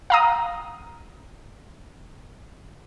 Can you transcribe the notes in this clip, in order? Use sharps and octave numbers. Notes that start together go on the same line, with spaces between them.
F5 A#5 D#6